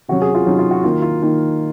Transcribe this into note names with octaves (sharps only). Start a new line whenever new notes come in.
C3 F#3 C#4 F#4
G#4
F4
C3 F#3 C#4 D#4
F4
F#4
D#3 A#3 D#4 F4
F4
D#3 A#3 D#4